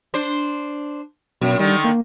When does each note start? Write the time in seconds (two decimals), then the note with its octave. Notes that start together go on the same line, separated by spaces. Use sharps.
0.14 D4 C5
1.41 F#2 B2
1.59 D3 D#3 G3
1.84 A#3